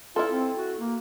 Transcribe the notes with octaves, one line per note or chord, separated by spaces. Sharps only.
E4 F4 A4
C4
F#4
A#3